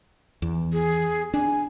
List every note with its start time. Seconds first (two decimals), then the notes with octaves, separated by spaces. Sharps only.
0.42 E2
0.73 G#4
1.34 D4 G#5